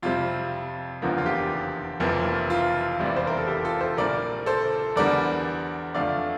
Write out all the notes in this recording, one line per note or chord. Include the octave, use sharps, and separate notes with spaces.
F2 C3 G3 C4 F4
F1 E2 D3 F3 A#3 F4
F4
G4
F1 F2 E3 A#3
F4
F1 E2 C3 E3 G3
D5
C5
A#4
A4
G4
F4 A4
A4 C5
A#1 A#2 G3 A#3 A#4 D5
A4 C5
E2 D3 G3 A#4 D5
F2 D3 A3 D5 F5